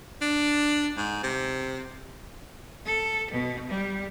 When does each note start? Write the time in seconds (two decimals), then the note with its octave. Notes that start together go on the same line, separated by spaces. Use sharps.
0.21 D4
0.97 G#2
1.23 C3
2.85 A4
3.31 B2
3.69 G3